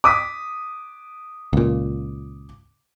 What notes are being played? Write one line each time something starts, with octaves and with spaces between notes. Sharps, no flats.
D6 D#6 B6
C#2 A#2